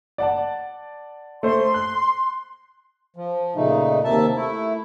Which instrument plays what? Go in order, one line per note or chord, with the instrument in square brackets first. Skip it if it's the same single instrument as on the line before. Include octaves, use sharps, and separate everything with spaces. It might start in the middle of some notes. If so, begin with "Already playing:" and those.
[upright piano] D5 F#5 A5
[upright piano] A3 C5 [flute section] C6
[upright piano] F#6
[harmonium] F3
A#2 C#3 A3 D#4
D#2 C3 A#3 E5 A5
A3 E4